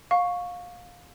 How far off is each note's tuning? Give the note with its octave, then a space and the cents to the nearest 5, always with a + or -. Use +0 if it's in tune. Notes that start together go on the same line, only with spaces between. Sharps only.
F5 +25 C#6 +0